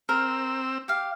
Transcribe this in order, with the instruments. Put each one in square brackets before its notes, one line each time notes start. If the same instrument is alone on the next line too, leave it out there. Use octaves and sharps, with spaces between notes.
[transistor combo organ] C4 E6 [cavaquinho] A#4
[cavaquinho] G4 F5